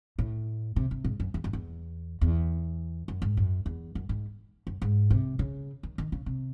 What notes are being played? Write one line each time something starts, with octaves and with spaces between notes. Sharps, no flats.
A2
C3
C3
G#2
F#2
E2
F#2
E2
E2
F#2
G#2
F#2
E2
F#2
G#2
F#2
G#2
C3
C#3
D#3
D#3
C#3
C3